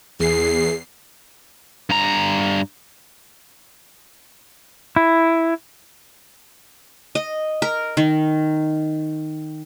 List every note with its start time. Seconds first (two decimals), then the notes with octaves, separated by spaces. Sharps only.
0.20 E2 G#4 C7
1.90 G2 A#5
4.96 E4
7.15 D#5
7.62 A#4
7.97 D#3